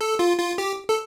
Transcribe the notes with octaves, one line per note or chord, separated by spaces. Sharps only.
A4
F4
F4
G4
A4